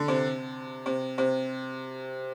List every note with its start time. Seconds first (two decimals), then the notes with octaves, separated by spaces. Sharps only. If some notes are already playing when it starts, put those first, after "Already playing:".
Already playing: D3
0.08 C3
0.86 C3
1.18 C3